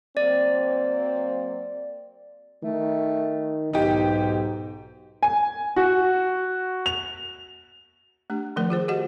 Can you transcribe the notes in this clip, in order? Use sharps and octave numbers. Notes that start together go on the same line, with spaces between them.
F#3 A#3 C4 D5
D#3 A3
B1 G#2 D#4 G4
G#5
F#4
F7
A3 D4 G4
D#3 F3 A3 A#4 D5
F4 G#4 C5
F#4 G4 D#5 F#5